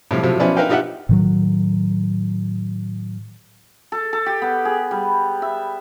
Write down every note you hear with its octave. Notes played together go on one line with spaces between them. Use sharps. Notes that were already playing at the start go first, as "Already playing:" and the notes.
A2 C3 F3 G3
A2 C3 F3 F#3
F3 F#3 B3 C#4 E4 D5
D#4 A#4 B4 E5 F5 G5
D#4 F4 G4 E5 F#5 F#6
A2 D#3 F#3
A4
A4
G4
B3
G#4
G3
E5